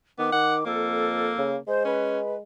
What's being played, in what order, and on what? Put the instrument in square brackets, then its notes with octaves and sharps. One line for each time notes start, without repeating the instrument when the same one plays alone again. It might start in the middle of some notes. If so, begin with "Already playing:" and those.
[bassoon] D#3 [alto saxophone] B3 [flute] D6
[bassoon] D#3 [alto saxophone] F#5
[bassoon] F2 [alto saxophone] A#3 [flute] A4
[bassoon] C#3
[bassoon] G#3 [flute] C5
[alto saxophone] C#4 [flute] B4